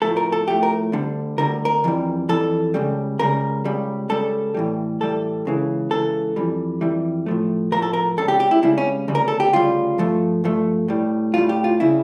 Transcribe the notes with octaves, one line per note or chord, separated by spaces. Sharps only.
A2 F3 A3 A4
A#4
A4
A2 F3 A3 G4
A#4
D2 D3 G3
D2 D3 G3 A#4
A#4
F2 E3 G3
F2 E3 G3 A4
C#2 C#3 G3
C#2 C#3 G3 A#4
C#2 C#3 G3
C#2 C#3 G3 A4
A2 E3 G3
A2 E3 G3 A4
C#2 C#3 E3
C#2 C#3 E3 A4
F2 E3 G3
F2 E3 G3
A2 F3 A3
A2 F3 A3 A#4
A4
A#4
C#2 C#3 G3 A4
G4
G4
E4
C#2 C#3 G3 E4
C#4
D2 C#3 G3
A#4
A4
G4
D2 C#3 G3 F4
G2 F3 A3
G2 F3 A3
A2 G3
A2 G3 F4
G4
F4
C#3 G3 E4